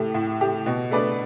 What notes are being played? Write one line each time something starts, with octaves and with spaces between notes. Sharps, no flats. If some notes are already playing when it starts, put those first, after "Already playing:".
Already playing: A2 A3 G4
A2
A3 G4
B2
A3 D4 B4 D5